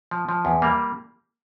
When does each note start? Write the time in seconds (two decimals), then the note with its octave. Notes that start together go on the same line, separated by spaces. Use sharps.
0.11 F3
0.29 F3
0.45 E2
0.62 G3 A#3